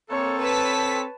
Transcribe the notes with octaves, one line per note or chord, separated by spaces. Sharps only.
A#3 C4 A4 C#5
B4 C#5 A5 B6